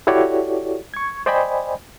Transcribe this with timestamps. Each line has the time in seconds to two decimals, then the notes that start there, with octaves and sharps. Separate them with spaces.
0.07 E4 F#4 G4 A4 C#5 D5
0.94 C#6 G#6
1.26 C5 D5 D#5 G5 G#5 B5